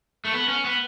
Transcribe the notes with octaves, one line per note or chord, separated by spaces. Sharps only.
A3
B3
C#4
B3